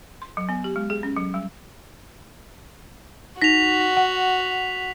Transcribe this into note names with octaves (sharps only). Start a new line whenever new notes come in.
C6
F#3
B3
G4
G#3
G#4
C#4
F#3
G3
D#4 F#4 A#6 B6 F7
F#5